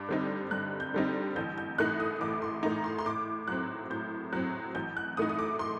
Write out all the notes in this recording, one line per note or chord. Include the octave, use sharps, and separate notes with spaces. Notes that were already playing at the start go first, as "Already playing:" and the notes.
Already playing: G2 D6
D3 G3 C4 D#4
G2 F#6
G6
D3 G3 C4 D#4
A1 G6
G6
A2 A3 D#4 F#6
D#6
A1 D6
C6
A2 A3 D#4 A#5
C6
C6
A2 D6
F#3 C4 F#6
A2 G6
F#3 C4 F#6
A1 G6
F#6
A2 A3 D#4 D#6
D#6
D6
C6